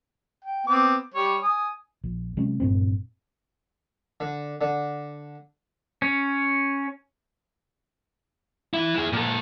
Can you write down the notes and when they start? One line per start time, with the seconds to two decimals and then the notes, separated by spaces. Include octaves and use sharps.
0.45 G5
0.67 B3 C4 D6
1.14 G3 C#5
1.43 G#5 D#6
2.04 A#1
2.37 C3 F#3 G#3 C#4
2.60 F#1 G2 A#2 C4
4.20 D3
4.61 D3
6.02 C#4
8.74 E3 E4
8.95 E4 G#4
9.13 A#2 A4